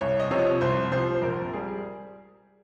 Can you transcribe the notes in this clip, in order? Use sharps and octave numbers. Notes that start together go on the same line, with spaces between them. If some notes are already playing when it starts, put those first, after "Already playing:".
C2 C#5
D#5
C3 F3 C#5
C2 C5
C3 F3 C5
C5
A#1 A#4
G3 G#4